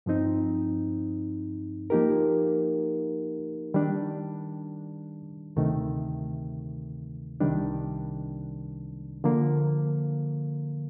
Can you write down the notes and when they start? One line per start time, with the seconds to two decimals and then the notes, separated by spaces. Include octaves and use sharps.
0.06 G2 F3 C4 D#4
1.90 F3 A#3 D#4 G4 A#4
3.74 D#3 G3 D4
5.56 D2 C3 D#3 A3
7.40 C2 C3 D#3 G3 D4
9.24 D3 F3 A#3